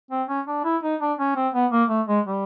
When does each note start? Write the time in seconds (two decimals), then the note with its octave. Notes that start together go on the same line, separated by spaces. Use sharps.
0.11 C4
0.28 C#4
0.47 D4
0.64 E4
0.83 D#4
1.01 D4
1.19 C#4
1.36 C4
1.54 B3
1.72 A#3
1.89 A3
2.08 G#3
2.26 G3